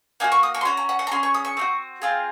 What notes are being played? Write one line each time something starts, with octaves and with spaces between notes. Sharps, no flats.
A#3 D#4 F#4 G#5
C#6
D#6
C#6
C6
C#4 F#4 A#5
A#5
F#5
F#5
A#5
C#4 G#4 C6
C#6
D#6
C#6
C4 D#4 F#4
C4 F4 G#4